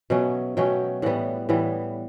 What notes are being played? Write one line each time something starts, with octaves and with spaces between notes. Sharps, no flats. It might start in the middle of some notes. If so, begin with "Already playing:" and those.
B2 F#3 A3 C#4
B2 F#3 A3 C#4 G5
A2 E3 G3 B3 F#5
A2 E3 G3 B3